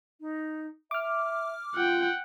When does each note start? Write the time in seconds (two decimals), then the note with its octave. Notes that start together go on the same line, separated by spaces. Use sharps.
0.20 D#4
0.91 E5 D6 F6
1.75 F4 F#5 G5